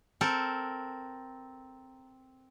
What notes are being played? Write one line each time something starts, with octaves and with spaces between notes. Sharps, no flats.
C4 A4 A#4